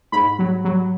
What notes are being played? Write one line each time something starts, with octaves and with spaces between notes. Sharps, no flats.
G#2 B5
F#3
F#3